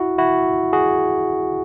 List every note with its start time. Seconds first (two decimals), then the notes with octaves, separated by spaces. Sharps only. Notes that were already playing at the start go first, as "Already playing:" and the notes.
Already playing: E4 F#4
0.18 E4 F#4
0.73 F#4 G#4